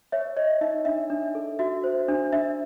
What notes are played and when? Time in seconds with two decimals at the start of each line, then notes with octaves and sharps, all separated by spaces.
0.12 C#5 E5
0.37 C#5 D#5
0.61 D#4 E5
0.85 D4 E5
1.10 D4
1.35 A4
1.59 F#4 E5
1.84 C5
2.09 D4
2.33 D4 E5